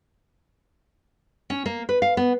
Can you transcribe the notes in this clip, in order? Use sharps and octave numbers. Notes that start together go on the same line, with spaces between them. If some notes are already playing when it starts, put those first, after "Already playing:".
C#4
A#3
B4
F5
B3